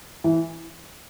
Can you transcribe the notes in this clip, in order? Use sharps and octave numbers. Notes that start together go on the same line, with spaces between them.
E3